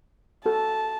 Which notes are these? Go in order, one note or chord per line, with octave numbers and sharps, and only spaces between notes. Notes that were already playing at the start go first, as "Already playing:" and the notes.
F#4 A4 A5